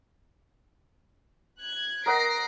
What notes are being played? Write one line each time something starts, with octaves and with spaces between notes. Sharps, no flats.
F#6 G#6
A#4 D#5 F#5 A#6 C7 D7